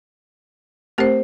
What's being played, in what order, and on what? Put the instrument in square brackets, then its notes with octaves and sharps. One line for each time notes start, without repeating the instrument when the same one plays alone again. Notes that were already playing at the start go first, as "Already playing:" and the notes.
[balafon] A3 C4 G4 [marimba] A#4 C5